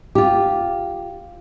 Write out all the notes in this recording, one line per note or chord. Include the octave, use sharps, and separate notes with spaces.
F4 G4